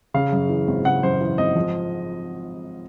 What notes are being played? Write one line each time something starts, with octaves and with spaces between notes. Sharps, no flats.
C#3 F5
F#2
E3
G#1
C#3 F#5
F#2 C5
E3
G#1 D#5
F3